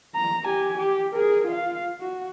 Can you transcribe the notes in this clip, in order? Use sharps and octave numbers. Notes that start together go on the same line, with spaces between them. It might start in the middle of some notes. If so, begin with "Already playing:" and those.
A#5
G4 G#5
G4
G#4 A#4
F4 F5
F#4